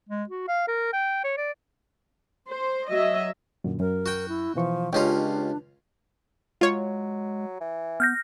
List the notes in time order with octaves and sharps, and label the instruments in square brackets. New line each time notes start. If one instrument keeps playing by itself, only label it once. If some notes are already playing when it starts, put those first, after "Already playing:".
[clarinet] G#3
F#4
F5
A#4
G5
C#5
D5
[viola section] C5
F#3 D#5 E5
[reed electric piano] F#2 A#2 D3
[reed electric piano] F#2 [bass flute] A#4
[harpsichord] F#4 G5
[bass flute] E4
[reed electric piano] B2 E3 C#6 [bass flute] F3
[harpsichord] C#2 C#4 F4 [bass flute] D4 [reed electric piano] G4 D#5 G5
[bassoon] F#3 [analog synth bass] G#3 [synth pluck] F4 C#5
[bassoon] E3
[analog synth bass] B3 [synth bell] F6 G6 A#6